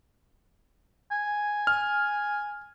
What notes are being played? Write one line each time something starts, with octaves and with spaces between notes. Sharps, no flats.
G#5
F6